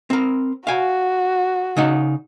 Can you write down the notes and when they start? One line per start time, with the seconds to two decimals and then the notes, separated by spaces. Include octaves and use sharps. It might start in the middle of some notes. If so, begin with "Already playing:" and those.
0.10 C4 A#4
0.67 F#4 F5 G#5
1.77 C#3 D#4 F#5